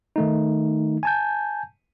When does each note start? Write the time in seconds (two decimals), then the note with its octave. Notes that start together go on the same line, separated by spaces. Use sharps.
0.16 D#3 A3 D#4
1.03 G#5 A5 G6